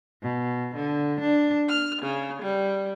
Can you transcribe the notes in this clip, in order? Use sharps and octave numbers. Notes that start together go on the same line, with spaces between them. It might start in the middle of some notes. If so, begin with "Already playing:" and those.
B2
D3
D4
F6
C#3
G3